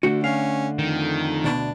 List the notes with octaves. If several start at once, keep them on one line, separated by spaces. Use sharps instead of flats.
D3 A3 F#4
C#4 F5
F2 D#3
D2 B2 D4